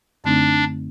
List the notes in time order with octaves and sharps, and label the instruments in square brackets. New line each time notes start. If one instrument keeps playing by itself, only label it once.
[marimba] F#2 D3 A3 C4 D#4 [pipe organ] D4